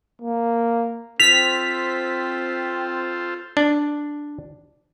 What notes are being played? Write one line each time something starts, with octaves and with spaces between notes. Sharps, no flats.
A#3
C4 F4 A4 C5 B6 F7
D4